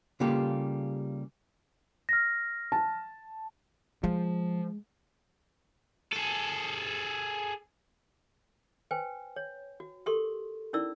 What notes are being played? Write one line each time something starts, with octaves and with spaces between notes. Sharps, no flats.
C#3 G3 A#3 F4 G4 A4
F6 A#6
A5
F3 G#3
G#4 A4
B4 C5 G5 G#5
C#5
F#4
G4 A4 A#4 C6 C#6
C#4 D#4 E4 A#4 D5 E6